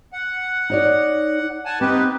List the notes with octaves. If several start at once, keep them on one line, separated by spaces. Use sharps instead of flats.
F#5
D#4 C#5 D5
F#5 G#5 A5
C4 D#4 G4 B4